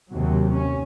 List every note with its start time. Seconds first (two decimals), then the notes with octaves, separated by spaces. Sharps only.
0.11 D#2 C3 F#3
0.53 C#4